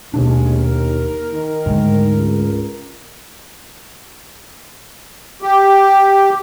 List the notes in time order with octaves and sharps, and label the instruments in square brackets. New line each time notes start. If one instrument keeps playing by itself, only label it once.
[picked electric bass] D#1 B2 D4 [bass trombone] D#2 [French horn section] G#3 C#4
[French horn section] A#4
[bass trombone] D#3
[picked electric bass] D2 G#2 G#3
[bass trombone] C#2
[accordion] G4